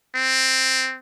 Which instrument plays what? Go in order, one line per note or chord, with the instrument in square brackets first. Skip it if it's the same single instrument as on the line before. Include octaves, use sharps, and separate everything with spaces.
[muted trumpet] C4